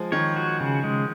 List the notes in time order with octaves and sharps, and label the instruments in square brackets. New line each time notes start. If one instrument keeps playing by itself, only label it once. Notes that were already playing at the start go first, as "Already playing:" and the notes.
Already playing: [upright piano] F3 G#3
[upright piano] D#3 [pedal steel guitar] C#5
[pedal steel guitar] F#4
C#3
G#3